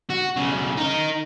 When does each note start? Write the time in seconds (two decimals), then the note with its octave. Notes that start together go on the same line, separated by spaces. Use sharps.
0.10 F#4
0.37 B1 C#3
0.77 D#4 A#4